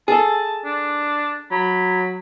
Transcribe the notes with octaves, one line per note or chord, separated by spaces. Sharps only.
G#4 A4 A5
D4
F#3 B5